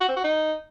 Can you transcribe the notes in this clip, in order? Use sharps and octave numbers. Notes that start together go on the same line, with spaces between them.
F#4
C4
F#4
D#4